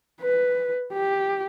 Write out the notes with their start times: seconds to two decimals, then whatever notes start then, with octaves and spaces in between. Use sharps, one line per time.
0.21 B4
0.94 G4